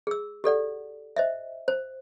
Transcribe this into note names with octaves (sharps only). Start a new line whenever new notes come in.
G#4 E6
G4 A4 D5 F#5
C5 D#5 E5
C5